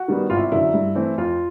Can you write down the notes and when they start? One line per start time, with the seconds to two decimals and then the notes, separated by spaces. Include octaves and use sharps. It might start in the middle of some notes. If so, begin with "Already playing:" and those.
Already playing: F#4
0.08 D#3 G3 B3
0.30 G#1 F4
0.37 E4
0.52 F#2 D3 E4
0.74 G2
0.95 E3 A3 C4
1.18 F2 F4